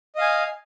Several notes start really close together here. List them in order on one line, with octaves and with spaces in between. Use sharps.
D#5 F5 G#5